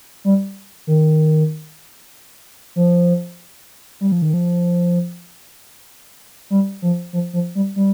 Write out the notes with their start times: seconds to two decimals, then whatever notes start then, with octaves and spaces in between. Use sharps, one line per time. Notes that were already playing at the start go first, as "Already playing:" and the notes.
0.25 G3
0.87 D#3
2.76 F3
4.01 G3
4.12 F3
4.22 D#3
4.34 F3
6.50 G3
6.82 F3
7.13 F3
7.33 F3
7.55 G3
7.76 G3